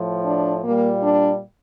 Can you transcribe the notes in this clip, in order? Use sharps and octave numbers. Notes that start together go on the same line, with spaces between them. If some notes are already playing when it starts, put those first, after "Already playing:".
Already playing: A2 F3
D4
A#2 G3 A#3
D4